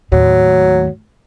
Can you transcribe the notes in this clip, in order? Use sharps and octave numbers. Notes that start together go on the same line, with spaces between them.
D#2 A2 F#3